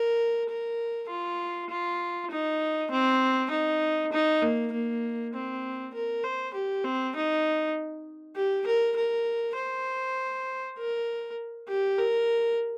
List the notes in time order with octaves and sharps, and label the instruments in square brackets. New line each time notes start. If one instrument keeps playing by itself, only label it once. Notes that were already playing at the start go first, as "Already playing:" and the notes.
Already playing: [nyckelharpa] A#4
A#4
F4
F4
D#4
C4
D#4
D#4
A#3
A#3
C4
A#4
C5
G4
C4
D#4
G4
A#4
A#4
C5
A#4
G4
A#4